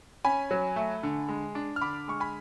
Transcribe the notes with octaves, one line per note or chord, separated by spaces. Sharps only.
C#4 G#5 B5
F#3
A3
D3
G#3
D4
F6
D3 B5 D6
G#3 C#6
G#5 B5